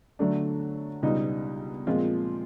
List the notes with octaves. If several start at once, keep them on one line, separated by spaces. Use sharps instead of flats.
D3 F#3 A3 D4
C#2 B2 G3 B3 D#4
A#2 F3 G#3 C4 F4